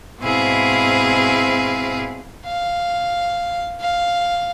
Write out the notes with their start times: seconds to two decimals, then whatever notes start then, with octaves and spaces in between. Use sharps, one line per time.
0.20 G#2 B2 C4 E4 G#4 F5
2.46 F5
3.81 F5